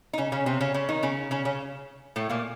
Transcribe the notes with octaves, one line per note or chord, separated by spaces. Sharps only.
D#4
C#3 C#4
C#3 C#4
C3 C4
C#3 C#4
C#3 C#4
D#3 D#4
C#3 C#4
C#3 C#4
C#3 C#4
A2 A3
A#2 A#3